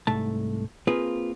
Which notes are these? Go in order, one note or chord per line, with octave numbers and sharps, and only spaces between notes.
C2 G#2 A3 A5
A#3 C4 F4 G#4 B4